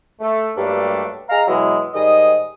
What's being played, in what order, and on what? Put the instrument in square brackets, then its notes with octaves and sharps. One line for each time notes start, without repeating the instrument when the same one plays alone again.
[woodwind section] A3
G2 F#3 G3 A3 A#3 D4
G#4 D#5 F5 A#5
B2 E3 F#3 G#3 E4
G#2 D#3 G3 G#4 D#5